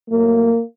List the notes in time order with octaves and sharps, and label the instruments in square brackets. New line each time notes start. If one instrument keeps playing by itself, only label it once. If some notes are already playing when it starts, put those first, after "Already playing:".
[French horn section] A2 F#3 A#3